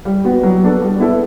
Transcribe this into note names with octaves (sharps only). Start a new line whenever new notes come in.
G3
B3 F#4
F#3
B3 D4 A4
G3
B3 E4 A4